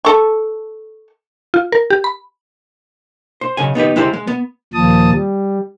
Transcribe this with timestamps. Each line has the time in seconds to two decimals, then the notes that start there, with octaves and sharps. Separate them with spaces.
0.05 A4 C#6
1.54 F4
1.72 A#4
1.90 G4
2.04 B5
3.41 C5
3.57 B1 C#3 G#5
3.75 B3 D#4 G4 B4
3.96 G#3 E4 G4 C5
4.13 G#3
4.27 B3
4.74 D#2 A#2 F3 A5 D#6
5.13 G3